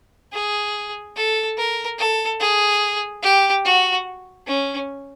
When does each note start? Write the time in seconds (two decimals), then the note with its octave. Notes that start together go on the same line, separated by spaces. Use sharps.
0.33 G#4
1.16 A4
1.57 A#4
1.98 A4
2.40 G#4
3.23 G4
3.65 F#4
4.47 C#4